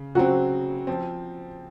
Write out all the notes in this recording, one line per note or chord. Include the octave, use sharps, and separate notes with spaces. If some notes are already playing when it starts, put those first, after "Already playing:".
Already playing: C#3
C#3 F#3 C4 F#4
F3 C4